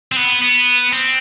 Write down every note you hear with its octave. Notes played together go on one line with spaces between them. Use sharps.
C4
B3
B3
C4